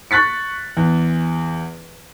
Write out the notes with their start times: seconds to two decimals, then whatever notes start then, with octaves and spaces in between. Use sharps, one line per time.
0.11 C#6 F#6 A6 B6 C#7
0.77 E2